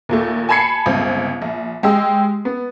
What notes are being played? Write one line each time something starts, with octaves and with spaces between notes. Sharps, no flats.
D#2 A#2 A3
G#5 A5 B5 G#6 C7 C#7
G1 C#2 C4
A#1
G#3 G4 D#5 E6
B3